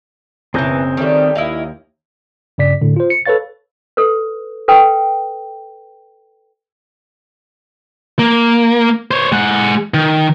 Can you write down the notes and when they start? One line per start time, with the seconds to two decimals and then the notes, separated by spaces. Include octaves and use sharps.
0.54 F#1 B2 E3 C4 G#4 C#5 A#5 G6
0.97 D#3 G3 A3 G4 C#5 D#6
1.35 D#2 E4 D#5 F5
2.58 G2 C#3 D5 B6
2.82 A2 D3
2.96 F4 C5
3.10 C#7
3.26 A4 B4 C#5 F5 A6
3.97 A4 B4
4.68 A4 B4 G5
8.19 A#3
9.11 C5 C#5
9.32 G#3 F#5
9.94 D#3